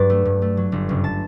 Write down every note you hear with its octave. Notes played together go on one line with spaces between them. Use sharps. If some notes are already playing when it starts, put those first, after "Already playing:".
Already playing: G2 F#3 B4 D5
A3
G2
A3
F#3
G1
F#1
A5